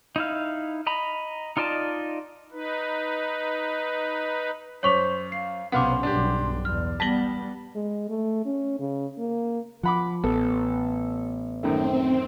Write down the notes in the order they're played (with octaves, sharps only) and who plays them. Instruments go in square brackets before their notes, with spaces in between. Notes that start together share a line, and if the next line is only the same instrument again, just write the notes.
[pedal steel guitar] D#4 E4 F5
D#5 A#5 B5
D#4 F4 D5 D#5 A5
[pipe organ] D#4 B4
[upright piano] F#2 B6 F7 [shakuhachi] C5 [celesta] C#5 C#6 D6
[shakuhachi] F5 [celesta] C7
[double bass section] B1 C3 C#4 [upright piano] B3 F5 [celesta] F#5 D6 [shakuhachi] C6
[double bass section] B1 G2 [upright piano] D4 G4
[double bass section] E2 [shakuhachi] D5 [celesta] F6
[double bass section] G3 B3 [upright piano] A5 A#6 G7 [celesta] B6 F#7
[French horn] G#3
A3
C#4
C#3
A#3
[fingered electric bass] F3 [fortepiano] F#5 B5 D6
[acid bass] A1 [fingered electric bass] B3 [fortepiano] A4
[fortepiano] F#2 D#3 A3 [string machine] C4